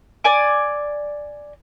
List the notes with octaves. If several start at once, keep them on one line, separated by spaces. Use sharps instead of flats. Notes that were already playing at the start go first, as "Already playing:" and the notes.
D5 G#5 D6